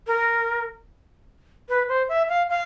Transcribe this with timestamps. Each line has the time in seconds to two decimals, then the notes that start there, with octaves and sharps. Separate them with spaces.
0.07 A#4
1.69 B4
1.89 C5
2.09 E5
2.29 F5
2.49 F5